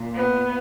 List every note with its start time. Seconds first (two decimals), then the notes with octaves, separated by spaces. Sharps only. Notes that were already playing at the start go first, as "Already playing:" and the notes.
Already playing: A#2
0.16 B3